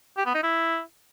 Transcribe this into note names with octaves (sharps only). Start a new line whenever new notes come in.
G4
B3
D#4
E4